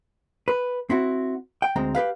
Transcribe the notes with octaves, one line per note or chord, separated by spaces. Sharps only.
B4
C4 E4 F#4
G5
D2 G#3 C4 A#5
G4 G#4 B4 F5